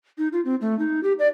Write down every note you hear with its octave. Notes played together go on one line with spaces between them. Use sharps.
D#4
F4
C4
A3
D#4
G4
D5